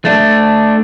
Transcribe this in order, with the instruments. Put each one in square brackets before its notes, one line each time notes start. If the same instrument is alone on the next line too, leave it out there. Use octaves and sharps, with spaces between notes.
[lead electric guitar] A3 D4